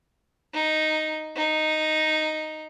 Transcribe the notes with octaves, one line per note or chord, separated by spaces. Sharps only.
D#4
D#4